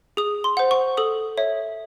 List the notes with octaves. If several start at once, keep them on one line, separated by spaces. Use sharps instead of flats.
G#4 D#6
C6
C5 F#5
C#6
A4 D#6
C#5 E5